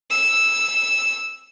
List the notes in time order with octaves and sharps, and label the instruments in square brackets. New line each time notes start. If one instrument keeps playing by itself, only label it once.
[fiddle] E6